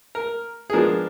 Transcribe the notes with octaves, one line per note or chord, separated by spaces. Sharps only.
A#4
G#4
F3 G#3 B3 D4 A#4